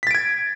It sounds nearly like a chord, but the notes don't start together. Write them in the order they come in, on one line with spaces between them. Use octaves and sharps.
B6 A6 D7 G#6